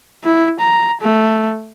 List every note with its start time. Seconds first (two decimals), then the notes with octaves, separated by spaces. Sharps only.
0.24 E4
0.60 A#5
1.02 A3